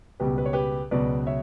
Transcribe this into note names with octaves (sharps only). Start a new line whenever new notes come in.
C#2 B2 G3 G4 B4
B4
C#5
G4 B4
C#2 B2 F#3 B4 D5
C#5 E5